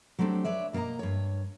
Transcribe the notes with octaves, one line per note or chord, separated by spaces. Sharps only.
F#3 A3 C4 D4 G4
B4 C#5 D5 E5
B2 A#3 A4 D#5 A#5
G2 C#5